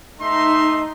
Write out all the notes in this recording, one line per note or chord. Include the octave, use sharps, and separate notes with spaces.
A3 D#4 E5 C6